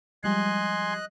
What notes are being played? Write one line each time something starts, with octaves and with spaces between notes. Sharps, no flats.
F3 G3 G#3 D#5 G#5 C6 F#6